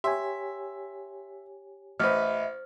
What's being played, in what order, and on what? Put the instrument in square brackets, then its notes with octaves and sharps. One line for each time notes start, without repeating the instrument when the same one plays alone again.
[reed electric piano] G4 C#5 G#5 [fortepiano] E5 [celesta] C6
[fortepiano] A1 B4 [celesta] C5 F6 [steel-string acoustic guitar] D#5 E5